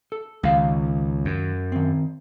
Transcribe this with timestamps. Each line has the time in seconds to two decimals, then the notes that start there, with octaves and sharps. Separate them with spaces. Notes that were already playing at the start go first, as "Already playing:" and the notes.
0.12 A4
0.43 C#2 D#3 F5
1.25 F#2
1.72 D#3 C4